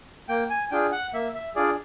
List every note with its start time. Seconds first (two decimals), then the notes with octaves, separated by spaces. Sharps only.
0.29 A#3 G5
0.50 G#5
0.71 D4 F4 G#4 G5
0.92 F#5
1.13 A#3 E5
1.35 E5
1.55 D4 F4 G#4 D5